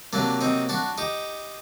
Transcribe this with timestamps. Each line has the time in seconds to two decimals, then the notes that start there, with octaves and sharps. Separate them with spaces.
0.13 C3 F#3 A#3 D4
0.41 C4 D#4
0.69 D4 F#4
0.98 D#4 G4